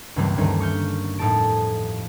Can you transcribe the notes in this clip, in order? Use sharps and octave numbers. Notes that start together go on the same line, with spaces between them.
C#2 G2 E3 G3 A#3 C4
D2 G2 D#3 E3 C#4
C#6 F6 G6
F2 A2 D#4 A4 A5 D7